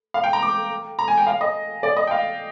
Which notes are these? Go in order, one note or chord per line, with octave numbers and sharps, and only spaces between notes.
F5
G5
A#5
D6
A#5
G#5
G5
F5
D#5
D5
D#5
G5
F5